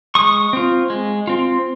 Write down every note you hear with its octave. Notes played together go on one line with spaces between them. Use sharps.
G#3 C#6 D#6
C4 F4
G#3
C4 F4